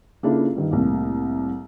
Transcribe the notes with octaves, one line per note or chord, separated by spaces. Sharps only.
C#3 A#3 D4 E4 F4 A4
G2 D#3
C2 A2 A#3